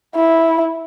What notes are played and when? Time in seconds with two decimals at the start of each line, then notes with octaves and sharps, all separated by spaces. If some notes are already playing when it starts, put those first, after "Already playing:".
0.15 E4